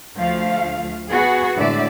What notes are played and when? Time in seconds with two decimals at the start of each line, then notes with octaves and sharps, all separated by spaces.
0.18 D2 F3 A3 F5
1.10 B3 F#4 G#4
1.56 A2 D3 G#3 D5 E5